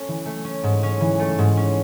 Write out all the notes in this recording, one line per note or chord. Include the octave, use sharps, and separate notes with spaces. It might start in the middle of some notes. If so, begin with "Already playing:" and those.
Already playing: A3 C#4
E3
A3
C#4
G#2
C#4
E3
A3
G#2
C#4